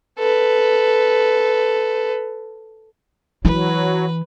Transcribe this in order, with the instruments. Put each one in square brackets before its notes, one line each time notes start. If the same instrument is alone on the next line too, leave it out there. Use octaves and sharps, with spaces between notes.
[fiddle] A4 B4
[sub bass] E3 [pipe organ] F#3 [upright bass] E4 [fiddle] B4